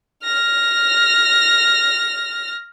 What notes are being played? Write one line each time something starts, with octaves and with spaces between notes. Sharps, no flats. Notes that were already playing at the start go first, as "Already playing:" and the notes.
F6 A#6